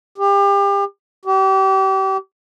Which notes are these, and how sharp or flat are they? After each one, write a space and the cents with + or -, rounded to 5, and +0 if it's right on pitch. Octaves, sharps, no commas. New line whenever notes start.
G4 +30
G4 -35